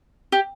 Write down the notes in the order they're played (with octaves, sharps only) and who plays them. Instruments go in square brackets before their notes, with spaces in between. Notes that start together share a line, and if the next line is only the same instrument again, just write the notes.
[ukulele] G4